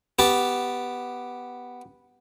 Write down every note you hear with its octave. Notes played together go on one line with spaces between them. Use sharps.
B3 G4 A5